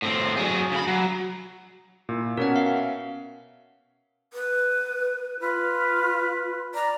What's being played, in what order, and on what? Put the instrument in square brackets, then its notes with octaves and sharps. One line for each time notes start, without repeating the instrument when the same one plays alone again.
[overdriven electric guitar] A2 C4
F#3 G#4
C#3 B5
F#3
[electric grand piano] A#2 E4
[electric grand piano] B2 C#4 [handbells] A#4 F#5
[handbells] E5 F5
[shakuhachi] B4
[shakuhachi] F4 [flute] B4
[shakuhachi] D5 [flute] A#5